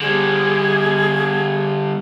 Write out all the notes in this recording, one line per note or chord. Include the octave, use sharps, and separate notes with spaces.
D3 G3 G#4